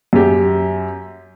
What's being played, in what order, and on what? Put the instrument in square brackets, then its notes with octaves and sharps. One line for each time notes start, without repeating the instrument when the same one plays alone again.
[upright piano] F#2 G4